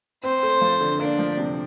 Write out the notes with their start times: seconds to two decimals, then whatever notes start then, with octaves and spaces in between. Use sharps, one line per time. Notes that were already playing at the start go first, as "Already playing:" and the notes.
0.24 C4 C5
0.43 A3
0.61 F3
0.81 D3
1.00 A#3 D4
1.19 F3
1.37 C3